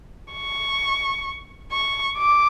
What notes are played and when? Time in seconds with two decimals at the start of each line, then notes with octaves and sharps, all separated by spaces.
0.32 C#6
1.71 C#6
2.18 D6